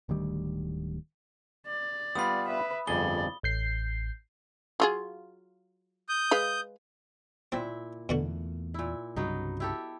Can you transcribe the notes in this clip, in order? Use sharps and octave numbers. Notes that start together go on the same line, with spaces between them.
D1 D2 D#3 G3
D5
G3 B3 F4 B5 D#6
B4 E5
G1 F2 G#4 D5 G7
A1 G6 C7
F#3 F4 G#4
D#6 G6
G#3 B4 F5
A#2 C4 E4 E5
E2 B2 D3 A3 F#4
A#2 E4
C2 G2 C#3 F#3 B3 D#4
E4 G4 A4